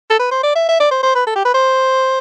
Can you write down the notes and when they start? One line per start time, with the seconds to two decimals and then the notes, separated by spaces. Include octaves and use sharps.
0.10 A4
0.19 B4
0.32 C5
0.43 D5
0.55 E5
0.69 E5
0.80 D5
0.91 C5
1.03 C5
1.15 B4
1.27 A4
1.36 G4
1.45 B4
1.54 C5